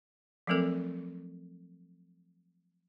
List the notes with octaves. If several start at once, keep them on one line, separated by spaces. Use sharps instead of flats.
F3 F#3 A3 C4 A4 A#4